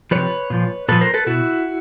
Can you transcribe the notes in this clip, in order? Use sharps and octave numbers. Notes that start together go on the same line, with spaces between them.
C3 F3 B4 C#5
A#2 F3
A#2 F3 A4 B4
A#4 C5
A4 B4
B2 E4 F#4